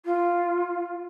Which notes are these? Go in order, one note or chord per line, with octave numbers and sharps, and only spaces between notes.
F4